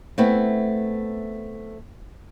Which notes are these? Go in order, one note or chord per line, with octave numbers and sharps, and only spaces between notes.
A3 B3 C4 E4